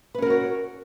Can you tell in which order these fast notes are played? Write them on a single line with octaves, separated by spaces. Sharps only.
B4 C#4 A#4 F#4 C#5